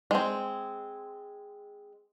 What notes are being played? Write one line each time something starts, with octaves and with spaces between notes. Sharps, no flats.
G#3 C4